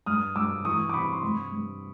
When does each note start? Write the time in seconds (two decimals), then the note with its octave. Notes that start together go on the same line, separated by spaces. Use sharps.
0.06 G2 D#6 F6
0.36 G2 D6 E6
0.65 E3 C#6 D#6
0.89 D6
0.93 C3 B5 C#6
1.13 C6
1.23 G2 B5 C#6
1.52 G2